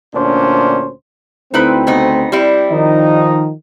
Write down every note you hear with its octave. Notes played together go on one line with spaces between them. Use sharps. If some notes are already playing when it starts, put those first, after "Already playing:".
D2 A#2 C#4 D4 C5
D2 A3 C4 D#4 E4 B4
C#3 B3 D#4
G3 C4 E4
D#3 F3 D#4